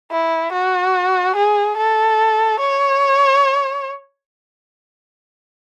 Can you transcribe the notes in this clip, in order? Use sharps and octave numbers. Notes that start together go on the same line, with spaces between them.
E4
F#4
G#4
A4
C#5